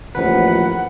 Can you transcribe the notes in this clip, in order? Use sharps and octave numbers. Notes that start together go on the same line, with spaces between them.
A1 D#2 F3 C#4 B4 F#5